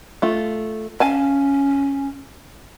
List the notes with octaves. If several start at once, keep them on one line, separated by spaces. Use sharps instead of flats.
A3 F4
C#4 F5 G#5 A5